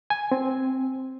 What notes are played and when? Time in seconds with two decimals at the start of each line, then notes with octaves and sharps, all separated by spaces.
0.10 G#5
0.32 C4